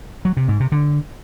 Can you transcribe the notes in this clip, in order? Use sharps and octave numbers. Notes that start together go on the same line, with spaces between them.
F#3
C3
G#2
C3
D3